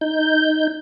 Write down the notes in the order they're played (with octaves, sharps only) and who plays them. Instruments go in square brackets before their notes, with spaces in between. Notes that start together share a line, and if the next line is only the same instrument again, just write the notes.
[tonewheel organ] D#4 G6